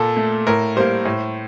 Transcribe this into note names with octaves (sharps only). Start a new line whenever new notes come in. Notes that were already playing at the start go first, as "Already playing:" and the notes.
Already playing: A#2 A4
A3
A2 A#4
G3 A#3 C5
A2